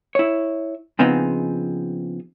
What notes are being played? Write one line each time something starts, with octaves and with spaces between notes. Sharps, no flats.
E4 C#5
C#3 F3 B3 C4 D#4 G#4